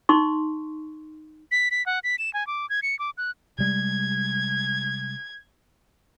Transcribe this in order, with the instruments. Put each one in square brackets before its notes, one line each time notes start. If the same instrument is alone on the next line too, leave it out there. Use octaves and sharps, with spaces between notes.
[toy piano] D#4 C6 C#6
[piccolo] B6
B6
F#5
B6
E7
G#5
D6
G#6
C#7
D6
F#6
[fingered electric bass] C3 G3 G#3 [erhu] G#6